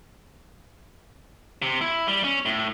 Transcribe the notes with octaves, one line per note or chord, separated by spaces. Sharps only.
C3
E4
G3
C#4
A2